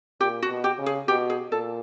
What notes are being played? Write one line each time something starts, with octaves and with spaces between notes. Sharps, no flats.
A#2 G4
F#4
B2
G4
C#3
G#4
B2 G4
G#4
A#2 A4